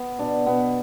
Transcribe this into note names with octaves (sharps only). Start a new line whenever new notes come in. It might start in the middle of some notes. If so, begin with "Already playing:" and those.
Already playing: B3
B2 D4
B2 B3